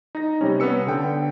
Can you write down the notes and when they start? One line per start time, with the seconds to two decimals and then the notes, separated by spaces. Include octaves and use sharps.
0.15 D#4 A#6
0.41 C3 G3 C#4
0.60 B3 C#4 B4 E6 C#7
0.87 D3 G5